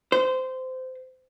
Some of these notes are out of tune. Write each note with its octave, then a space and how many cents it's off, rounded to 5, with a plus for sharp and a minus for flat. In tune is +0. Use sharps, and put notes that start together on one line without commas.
C5 -20